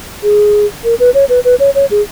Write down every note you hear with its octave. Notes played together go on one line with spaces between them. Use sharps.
G#4
A#4
B4
C#5
B4
B4
C#5
C#5
G#4